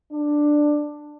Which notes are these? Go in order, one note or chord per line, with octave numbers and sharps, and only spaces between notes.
D4